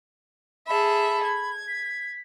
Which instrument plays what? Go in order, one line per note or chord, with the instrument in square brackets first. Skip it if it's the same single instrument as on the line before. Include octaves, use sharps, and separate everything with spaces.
[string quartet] G#4 A4 E5 [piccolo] B5
[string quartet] G#6
[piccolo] B6